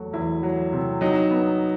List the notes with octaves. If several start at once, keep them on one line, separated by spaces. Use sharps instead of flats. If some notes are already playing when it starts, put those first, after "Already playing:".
Already playing: E2 F#3 A3 F#4
E2 E4
F#3
C3
F#3 D#4
B3